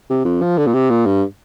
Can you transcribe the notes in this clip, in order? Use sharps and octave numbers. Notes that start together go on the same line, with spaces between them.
C3
F2
F3
D3
A#2
C3
A#2
G2